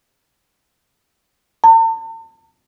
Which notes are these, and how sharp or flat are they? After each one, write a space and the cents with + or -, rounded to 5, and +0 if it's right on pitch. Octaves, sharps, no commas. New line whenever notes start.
A5 +45